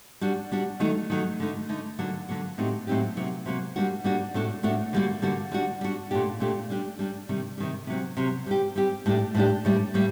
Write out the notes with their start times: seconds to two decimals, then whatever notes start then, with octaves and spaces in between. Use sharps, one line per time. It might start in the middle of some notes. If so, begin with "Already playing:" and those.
0.21 G3 D4 F#4
0.52 G3 D4 F#4
0.80 D#3 F#3 A3 D#4
1.10 D#3 F#3 A3 D#4
1.40 D3 A3 D#4
1.69 D3 A3 D#4
1.99 D3 F#3 A#3 F#4
2.28 D3 F#3 A#3 F#4
2.58 A2 F#3 C4 D#4 G4
2.87 A2 F#3 C4 D#4 G4
3.17 C3 F#3 A#3
3.45 C3 F#3 A#3
3.76 G3 A#3 D4 F#4
4.04 G3 A#3 D4 F#4
4.34 A2 A3 D4 F#4
4.63 A2 A3 D4 F#4
4.93 D3 G3 A#3 F#4
5.22 D3 G3 A#3 F#4
5.52 G3 D4 F#4
5.81 G3 D4 F#4
6.11 A#2 A3 D4 G4
6.40 A#2 A3 D4 G4
6.70 G3 D4 G4
6.99 G3 D4 G4
7.29 C3 D#3 G3
7.58 C3 D#3 G3
7.87 C3 F#3 C4
8.17 C3 F#3 C4
8.47 G3 C4 G4
8.76 G3 C4 G4
9.06 A2 G3 D4 G4
9.35 A2 G3 D4 G4
9.65 A2 G3 A#3
9.94 A2 G3 A#3